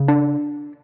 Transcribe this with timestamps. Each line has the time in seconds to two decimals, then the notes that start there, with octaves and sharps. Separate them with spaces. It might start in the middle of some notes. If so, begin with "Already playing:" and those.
Already playing: C#3
0.08 D4